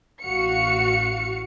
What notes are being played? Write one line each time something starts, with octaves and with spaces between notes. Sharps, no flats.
A1 F#4 F5 C#7